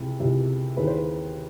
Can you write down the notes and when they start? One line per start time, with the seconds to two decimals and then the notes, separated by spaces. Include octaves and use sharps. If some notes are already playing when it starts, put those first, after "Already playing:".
Already playing: C#2 C3 E3
0.20 C#2 C3 E3
0.77 D#2 C#3 E3 B4
0.87 C5
0.98 B4